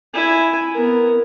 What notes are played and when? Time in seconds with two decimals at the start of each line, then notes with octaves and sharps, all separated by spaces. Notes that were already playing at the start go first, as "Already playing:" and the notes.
0.14 E4 G#5
0.74 B3 A#4